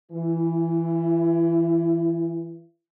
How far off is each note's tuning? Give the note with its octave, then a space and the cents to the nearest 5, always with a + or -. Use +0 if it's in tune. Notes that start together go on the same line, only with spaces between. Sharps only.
E3 +0 E4 +35